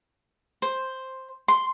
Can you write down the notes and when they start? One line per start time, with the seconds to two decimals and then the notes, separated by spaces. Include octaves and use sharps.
0.62 C5
1.48 C6